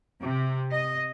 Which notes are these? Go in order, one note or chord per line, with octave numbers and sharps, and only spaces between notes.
C3
D#5